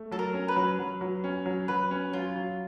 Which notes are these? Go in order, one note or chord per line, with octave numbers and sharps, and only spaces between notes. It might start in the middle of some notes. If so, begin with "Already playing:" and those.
Already playing: A3
F#3 A4
A#4
C#4
B4
F#3
F#3
F#3
C#4
F#3
F#3 B4
C#4
F#3 F4
F#3